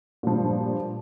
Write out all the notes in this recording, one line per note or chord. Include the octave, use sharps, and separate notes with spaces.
G2 A#2 F3